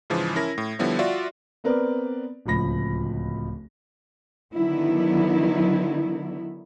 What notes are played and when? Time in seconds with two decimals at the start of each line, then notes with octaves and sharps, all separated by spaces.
0.10 G#2 C#3 E3 F3
0.36 C#4 E4 A#4 A#6
0.58 A2
0.79 D3 F3 G3 B3 E4 C#5
0.99 F4 F#4 D5 E5
1.64 B3 C4 A#4 B4 D5
2.46 D1 C#2 F3 B5 A#6
4.53 D3 D#3 F#3 B3 E4